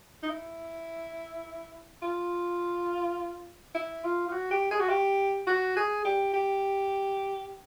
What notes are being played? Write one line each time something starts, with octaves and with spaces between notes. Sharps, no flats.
D#4
E4
F4
E4
F4
F4
F#4
G4
G#4
F#4
G4
F#4
G#4
G4
G4